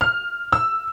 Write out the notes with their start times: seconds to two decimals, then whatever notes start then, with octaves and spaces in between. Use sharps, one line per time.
0.01 F6
0.52 E6